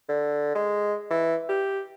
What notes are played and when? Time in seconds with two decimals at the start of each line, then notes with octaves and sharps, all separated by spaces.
0.09 D3
0.55 G#3
1.10 E3
1.49 G4